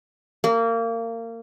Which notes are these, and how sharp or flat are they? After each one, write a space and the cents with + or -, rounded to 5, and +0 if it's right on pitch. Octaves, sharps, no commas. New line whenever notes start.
A#3 -25